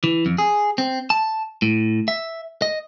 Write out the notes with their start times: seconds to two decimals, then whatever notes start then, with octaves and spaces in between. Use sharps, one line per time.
0.04 E3
0.26 F2
0.38 G#4
0.78 C4
1.10 A5
1.62 A2
2.08 E5
2.62 D#5